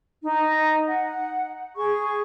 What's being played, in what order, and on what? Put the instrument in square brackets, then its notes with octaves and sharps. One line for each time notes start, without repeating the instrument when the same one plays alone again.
[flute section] D#4
F#5
G#4 C#6